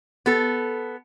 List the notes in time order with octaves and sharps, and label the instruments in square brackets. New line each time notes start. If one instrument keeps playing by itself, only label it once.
[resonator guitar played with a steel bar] B3 A4